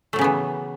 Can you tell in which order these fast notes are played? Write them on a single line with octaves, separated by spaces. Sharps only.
A3 F#3 C#3 B3 E3